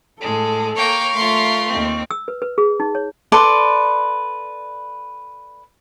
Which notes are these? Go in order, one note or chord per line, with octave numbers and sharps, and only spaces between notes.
A2 G#3 A4
A#3 A#4 C#5 F5 G5 C#6
A3 F4 B5 C6
D#2 C4
E6
B4
B4
G#4
D#4
C#5
A4 B4 D5 C6